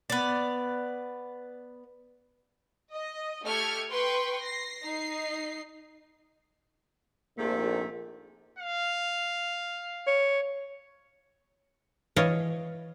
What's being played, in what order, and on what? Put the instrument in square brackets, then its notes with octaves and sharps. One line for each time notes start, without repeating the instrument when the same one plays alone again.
[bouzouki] B3 D5
[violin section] D#5
A3 G4 A4 F6 G#6 C#7
B4 G5 C6 C#6
A#6 C7
D#4 C7
[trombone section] A#1 G#2 [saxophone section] C3 A3 [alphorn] A#3
[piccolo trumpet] F5
[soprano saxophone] C#5
[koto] E3 C#5 D#5 F5 A5